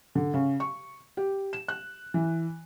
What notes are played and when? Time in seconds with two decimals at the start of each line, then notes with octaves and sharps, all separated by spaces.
0.15 D3
0.34 C#3
0.60 C#6
1.17 G4
1.53 E7
1.68 F#6
2.14 E3